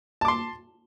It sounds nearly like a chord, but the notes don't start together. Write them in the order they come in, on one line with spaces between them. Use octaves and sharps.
A5 D6 C6